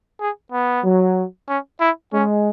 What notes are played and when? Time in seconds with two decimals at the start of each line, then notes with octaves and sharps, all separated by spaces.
0.20 G#4
0.52 B3
0.84 F#3
1.49 C#4
1.81 E4
2.12 G#3 C#4